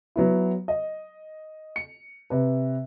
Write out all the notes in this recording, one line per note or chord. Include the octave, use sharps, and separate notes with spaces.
F#3 B3 E4
D#5
C#7
C3 B4